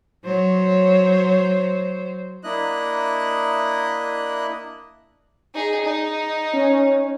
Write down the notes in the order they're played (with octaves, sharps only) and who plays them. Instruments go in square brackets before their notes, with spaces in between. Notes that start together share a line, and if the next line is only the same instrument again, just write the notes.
[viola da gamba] F#3 C5 C#5
[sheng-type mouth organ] A#3 D4 E4 D#5 F#6
[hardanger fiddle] D#4 G#4
D#4
[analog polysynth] C#4